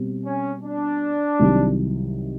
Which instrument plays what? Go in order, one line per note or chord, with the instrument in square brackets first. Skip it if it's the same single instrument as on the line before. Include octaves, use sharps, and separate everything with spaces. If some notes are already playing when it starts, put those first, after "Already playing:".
Already playing: [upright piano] B2 G3 C4
[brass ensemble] C#4
D4
[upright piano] C2 C3 D#3 F#3